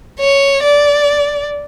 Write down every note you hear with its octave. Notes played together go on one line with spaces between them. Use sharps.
C#5
D5